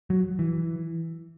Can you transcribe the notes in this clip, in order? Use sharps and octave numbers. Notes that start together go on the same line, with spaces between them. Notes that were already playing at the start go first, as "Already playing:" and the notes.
F#3
E3